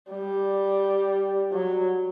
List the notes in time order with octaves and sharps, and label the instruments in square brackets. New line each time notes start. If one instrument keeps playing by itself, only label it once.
[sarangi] G3
F#3